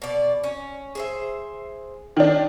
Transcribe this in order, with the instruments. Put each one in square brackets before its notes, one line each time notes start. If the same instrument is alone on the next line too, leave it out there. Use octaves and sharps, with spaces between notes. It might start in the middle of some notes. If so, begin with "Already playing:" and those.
[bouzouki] B2 D5
C#4
G#4 C5 E5
[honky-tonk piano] D#3 D4